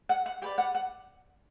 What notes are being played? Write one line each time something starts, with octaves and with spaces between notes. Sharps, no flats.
F#5
F#5
G4 B4 D5 G5
F#5
F#5